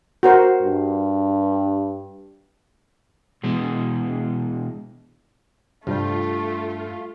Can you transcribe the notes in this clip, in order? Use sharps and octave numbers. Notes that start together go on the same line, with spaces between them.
F#4 A#4 C5
G2
B2 E3 G#3
G2 C3 G3 A3 F4